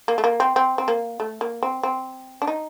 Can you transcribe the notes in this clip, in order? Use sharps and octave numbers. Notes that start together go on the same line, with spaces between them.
A#3
A3
A#3
C4
C4
C4
A#3
A3
A#3
C4
C4
D4
D#4